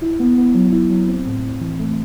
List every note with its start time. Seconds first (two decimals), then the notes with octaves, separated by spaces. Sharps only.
0.02 E4
0.19 B3
0.38 B3
0.54 F#3
0.72 E4
0.90 F#3
1.08 C4
1.26 A2
1.43 A2
1.61 E3
1.79 A3